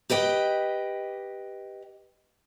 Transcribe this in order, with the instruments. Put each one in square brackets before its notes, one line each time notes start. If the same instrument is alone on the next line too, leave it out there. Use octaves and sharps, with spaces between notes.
[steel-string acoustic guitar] G4 B4 D#5 G5